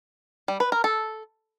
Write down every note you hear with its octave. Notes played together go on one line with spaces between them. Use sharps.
G3
B4
A#4
A4